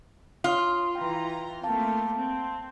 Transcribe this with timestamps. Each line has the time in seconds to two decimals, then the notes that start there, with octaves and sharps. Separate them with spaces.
0.44 F4 C#5 D#6
0.95 E3 G5 A#5
1.63 A3 A#3 C4 F5 A5
2.16 C4